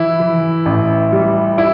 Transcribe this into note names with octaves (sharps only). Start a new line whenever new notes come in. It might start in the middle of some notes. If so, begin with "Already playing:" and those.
Already playing: E3 E4
E3
A1
G3
E4